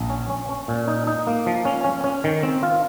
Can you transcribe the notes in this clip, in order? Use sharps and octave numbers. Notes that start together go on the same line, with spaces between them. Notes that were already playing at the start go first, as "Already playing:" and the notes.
Already playing: A#1
C#4
C#4
C#4
A#2
D#4
D#4
A#3
F3
C#4
C#4
C#4
D#3
C4
F4